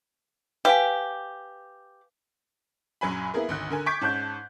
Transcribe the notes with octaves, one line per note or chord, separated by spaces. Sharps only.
G4 B4 F5 G#5
A#1 F#2 F#3 G#5 B5
A#3 B3 E4 G#4 A#4
G#1 D2 F#6
D3 A#4 G#5
C#6 D6 G6 G#6 B6 D7
G#2 C#4 A5 F#6 G6